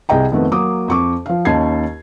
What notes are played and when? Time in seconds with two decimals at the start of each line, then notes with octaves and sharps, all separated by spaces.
0.09 C2 G#4 D#5 G5 A#5
0.32 F2 D#3 A3 B3
0.51 F#3 A#3 D6 D#6
0.88 F2 C#6 D6
1.26 F3 F5
1.45 D#2 C#4 D#4 A5 G#6 C7